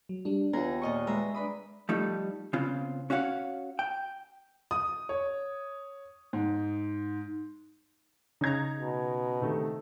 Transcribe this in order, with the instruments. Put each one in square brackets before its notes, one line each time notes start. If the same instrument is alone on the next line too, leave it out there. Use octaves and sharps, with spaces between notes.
[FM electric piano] F#3
G3 D4
[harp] D#2 G#4 A#5 [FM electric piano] B3 F4
[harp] A#2 D#5 C#6
[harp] G#3 E5 A#5 [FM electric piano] B4
[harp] D4 B5 D#6
[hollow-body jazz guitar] F3 G3 A3 D#4
C#3 B3 C4 F4
C#4 F#4 C#5 F5 F#5
G5
[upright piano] D#6
C#5
G#2
[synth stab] C#3 A#5 [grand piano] D#4 G#6
[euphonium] B2
[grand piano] C3 D#3 A3